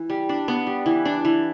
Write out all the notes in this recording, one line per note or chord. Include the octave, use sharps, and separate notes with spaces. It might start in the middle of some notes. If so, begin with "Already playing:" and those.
Already playing: E3
G3
D4
B3
G3
E3
D4
E3